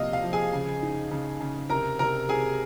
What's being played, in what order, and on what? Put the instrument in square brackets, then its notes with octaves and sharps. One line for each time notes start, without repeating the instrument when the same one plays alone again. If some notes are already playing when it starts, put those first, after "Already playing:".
Already playing: [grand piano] C3 F3 A#3 D#5 F5
F5
F3
G#4 G#5
C#3
D#4
C#3
C#3
C3 A#4 A#5
C3 A#4 A#5
C3 G#4 G#5